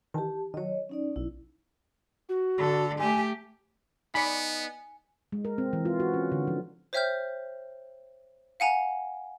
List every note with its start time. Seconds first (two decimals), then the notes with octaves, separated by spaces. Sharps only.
0.14 D#3 E3 G4 A5
0.54 D#3 F#3 C#5 D#5
0.89 C#4 D#4 D5
1.16 B1 E4
2.29 F#4
2.58 D3 A4
2.99 A3 G4 G#5
4.15 B3 D#4 D5 G#5 B5 C#7
5.32 G#3
5.45 A#4
5.58 C4
5.73 E3
5.85 F4
6.00 F#4
6.14 C#4
6.32 D3
6.47 F3
6.93 C5 C#5 E5 G5 F6 G6
8.60 F5 F#5 G#5 A#5